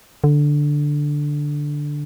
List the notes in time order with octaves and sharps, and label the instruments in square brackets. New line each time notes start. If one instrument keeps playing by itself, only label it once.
[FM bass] D3